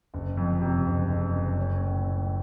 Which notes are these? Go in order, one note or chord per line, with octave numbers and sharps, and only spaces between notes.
F#1
F2
C3
F#1
F#1
F#1
C#4
A2
A2